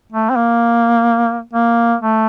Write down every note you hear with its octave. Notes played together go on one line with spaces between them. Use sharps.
A3
C4
A#3
A#3
A3